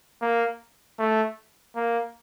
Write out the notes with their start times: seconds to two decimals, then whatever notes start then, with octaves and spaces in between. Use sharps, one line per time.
0.21 A#3
0.99 A3
1.76 A#3